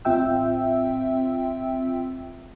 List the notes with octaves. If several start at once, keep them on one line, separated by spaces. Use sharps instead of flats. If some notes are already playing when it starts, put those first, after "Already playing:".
A1 C4 F4 E5 G5 E6